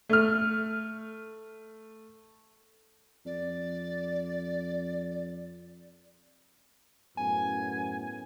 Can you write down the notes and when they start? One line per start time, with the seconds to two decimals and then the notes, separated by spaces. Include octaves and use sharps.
0.09 A3 F6
3.25 F2 D5
7.17 F#2 A2 B3 G#5